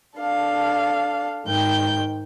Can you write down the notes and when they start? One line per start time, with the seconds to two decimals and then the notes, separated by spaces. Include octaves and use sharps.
0.18 D4 A4 F5
1.46 G#2 D#3 G5 G6